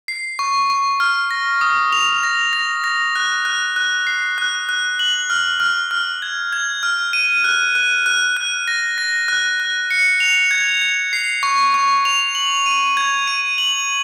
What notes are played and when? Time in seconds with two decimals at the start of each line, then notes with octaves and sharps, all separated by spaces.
0.08 C7
0.39 C#6
0.70 C#6
1.00 F6
1.31 A#6
1.61 D#6
1.92 F7
2.23 A#6
2.53 A#6
2.84 A#6
3.15 F#6
3.45 F#6
3.76 F#6
4.07 C7
4.38 F#6
4.69 F#6
4.99 F#7
5.30 F6
5.60 F6
5.91 F6
6.22 G#6
6.53 G#6
6.83 F6
7.13 D#7
7.44 F#6
7.75 F#6
8.06 F#6
8.37 F#6
8.68 A#6
8.98 A#6
9.28 F#6
9.60 F#6
9.91 C#7
10.20 F7
10.51 G#6
10.81 G#6
11.13 C7
11.43 C#6
11.74 C#6
12.05 F7
12.35 F#7
12.66 D#7
12.97 G#6
13.28 D#7
13.58 F#7